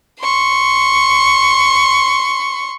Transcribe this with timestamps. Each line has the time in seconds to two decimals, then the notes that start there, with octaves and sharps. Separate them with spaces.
0.22 C6 C#6